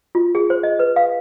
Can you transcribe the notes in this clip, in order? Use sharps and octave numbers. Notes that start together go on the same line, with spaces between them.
F4
G#4
C5
D#5
B4
F5